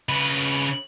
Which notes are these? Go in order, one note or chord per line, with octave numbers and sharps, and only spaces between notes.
C#3 B4